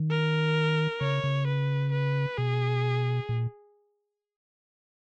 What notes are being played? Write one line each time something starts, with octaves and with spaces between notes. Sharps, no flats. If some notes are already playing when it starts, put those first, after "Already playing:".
Already playing: D#3
A#4
C#3 C#5
C#3
B4
B4
B2 G#4
A#2